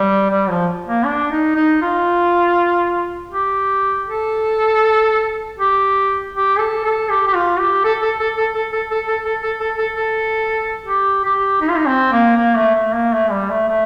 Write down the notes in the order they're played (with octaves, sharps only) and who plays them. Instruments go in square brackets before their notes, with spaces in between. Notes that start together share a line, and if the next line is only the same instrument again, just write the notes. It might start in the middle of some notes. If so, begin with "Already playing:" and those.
Already playing: [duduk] G3
G3
F3
A#3
D4
D#4
D#4
F4
G4
A4
G4
G4
A4
A4
G4
G4
F4
G4
A4
A4
A4
A4
A4
A4
A4
A4
A4
A4
A4
A4
A4
G4
G4
D#4
F4
D#4
C4
A#3
A#3
A3
A3
A#3
A3
G3
A3
A3